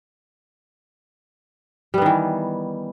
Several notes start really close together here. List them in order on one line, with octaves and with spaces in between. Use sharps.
G3 B3 D#3 E3